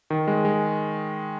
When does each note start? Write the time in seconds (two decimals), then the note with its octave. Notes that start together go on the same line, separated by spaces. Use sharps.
0.10 D#3
0.27 G#3
0.45 G#3